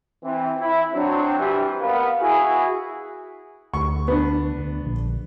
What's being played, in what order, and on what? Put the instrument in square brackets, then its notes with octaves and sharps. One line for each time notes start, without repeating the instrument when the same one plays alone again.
[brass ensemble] E3 C4
E4
F#3 C4 D4
C3 E3 G3
B3 A#4 B4 F5
E4 F#4 G#4
[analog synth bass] D2 [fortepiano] C#6
[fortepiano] B3 D4
[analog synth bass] D2
A#1